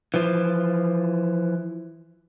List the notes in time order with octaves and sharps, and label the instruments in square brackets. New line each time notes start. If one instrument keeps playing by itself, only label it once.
[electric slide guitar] E3 F3